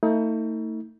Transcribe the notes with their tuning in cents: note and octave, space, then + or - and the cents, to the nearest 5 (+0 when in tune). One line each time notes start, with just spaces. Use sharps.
A3 +35 D#4 +40